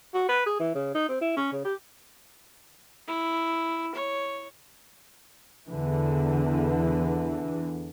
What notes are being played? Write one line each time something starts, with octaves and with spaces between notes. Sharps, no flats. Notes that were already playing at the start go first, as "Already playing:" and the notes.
F#4
B4
G#4
E3
C#3
D#4
C4
E4
C#4
C#3
G4
E4
C#5
E2 D3 E3